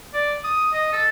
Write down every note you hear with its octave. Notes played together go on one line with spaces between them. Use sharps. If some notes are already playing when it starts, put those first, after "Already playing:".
D5
D#6
D#5
A4